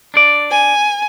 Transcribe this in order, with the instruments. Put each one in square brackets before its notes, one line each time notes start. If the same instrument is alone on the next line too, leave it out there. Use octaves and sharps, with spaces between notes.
[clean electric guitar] D4 D5
[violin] G#5